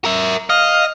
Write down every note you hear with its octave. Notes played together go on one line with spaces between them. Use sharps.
A#4 E5
D#5 F5